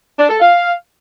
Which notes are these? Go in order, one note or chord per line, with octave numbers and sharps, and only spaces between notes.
D4
A4
F5